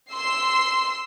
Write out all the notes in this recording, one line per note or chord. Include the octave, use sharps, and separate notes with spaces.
C6 E6 C7